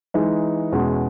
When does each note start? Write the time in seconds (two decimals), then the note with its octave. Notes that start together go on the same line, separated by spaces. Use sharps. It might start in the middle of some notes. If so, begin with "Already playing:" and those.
0.14 E3 G#3 D#4
0.72 E2 B2 G#3 C#4